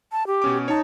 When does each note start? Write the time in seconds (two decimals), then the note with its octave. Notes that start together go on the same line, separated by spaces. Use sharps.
0.12 A5
0.27 G4
0.42 B2 C#4 D6
0.68 D#4 C#5 A5